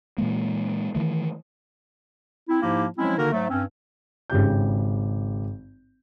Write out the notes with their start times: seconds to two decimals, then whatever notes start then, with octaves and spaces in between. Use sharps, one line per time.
0.18 A#2 E3 G#3 A#3
0.95 D#3 E3 A3
2.49 C4 E4
2.62 G#2 F3 A#3 D#4 E4 G4
2.98 F3 F#3 G#3 C4 C#4 E4
3.17 D3 D#3 A#3 D#4 F#4 A#4
3.32 G#2 F#3 A3
3.50 G2 C4 C#4
4.30 G#1 C#3 G4 G6